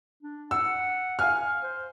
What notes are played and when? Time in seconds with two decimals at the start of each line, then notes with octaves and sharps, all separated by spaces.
0.23 D4
0.51 F#5 E6
1.19 F5 G#5 F6
1.62 C5